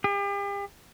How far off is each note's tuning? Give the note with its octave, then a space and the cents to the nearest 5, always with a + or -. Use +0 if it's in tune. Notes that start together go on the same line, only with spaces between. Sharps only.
G4 +40